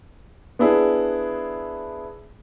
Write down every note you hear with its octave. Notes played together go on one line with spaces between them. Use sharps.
B3 D4 E4 G#4